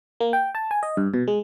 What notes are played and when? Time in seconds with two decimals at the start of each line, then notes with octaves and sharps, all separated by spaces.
0.20 A#3
0.33 G5
0.55 A5
0.71 G#5
0.83 D#5
0.97 G2
1.14 B2
1.28 G#3